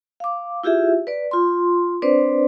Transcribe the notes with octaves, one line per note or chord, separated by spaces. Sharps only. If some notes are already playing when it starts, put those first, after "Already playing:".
F5 D6
E4 F4 G4 G#4 E5
B4 D5
F4 C6
C4 D4 B4 C5 D5